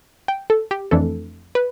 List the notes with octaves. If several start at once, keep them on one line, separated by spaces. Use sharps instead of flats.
G5
A4
G4
F2 E3 A3 D4 A4
B4